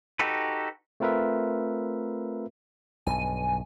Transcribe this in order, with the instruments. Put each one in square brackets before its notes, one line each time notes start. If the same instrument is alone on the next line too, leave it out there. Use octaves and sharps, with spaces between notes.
[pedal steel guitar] D#4 F#4 G4 A4 B4
[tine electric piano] A3 C4 F4 A#4 B4 E5
[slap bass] B1 G2 [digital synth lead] G#5